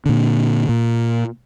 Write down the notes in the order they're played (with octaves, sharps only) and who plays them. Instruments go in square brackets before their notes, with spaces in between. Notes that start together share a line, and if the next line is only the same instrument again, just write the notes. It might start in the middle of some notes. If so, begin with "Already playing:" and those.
[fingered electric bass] A#2 D3
A#2